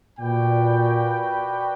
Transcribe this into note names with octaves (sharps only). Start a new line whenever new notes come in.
A#2 F#4 B4 D5 G5